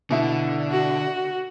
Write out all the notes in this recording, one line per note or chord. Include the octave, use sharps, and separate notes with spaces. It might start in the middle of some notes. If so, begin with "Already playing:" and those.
B2 D3 E4
F#4